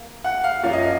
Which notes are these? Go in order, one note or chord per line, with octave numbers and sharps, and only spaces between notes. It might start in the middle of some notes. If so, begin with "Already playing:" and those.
Already playing: A#3
F#5
F5
F#2 F3 A#3 C#4 F5
D#5
F5